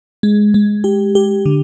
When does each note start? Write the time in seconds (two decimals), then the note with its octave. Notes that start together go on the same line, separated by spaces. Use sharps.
0.23 G#3
0.54 G#3
0.84 G4
1.15 G4
1.46 D3